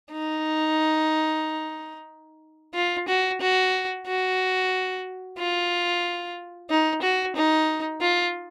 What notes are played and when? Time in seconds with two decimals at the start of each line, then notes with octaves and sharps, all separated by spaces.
0.12 D#4
2.74 F4
3.08 F#4
3.41 F#4
4.07 F#4
5.38 F4
6.70 D#4
7.02 F#4
7.36 D#4
8.01 F4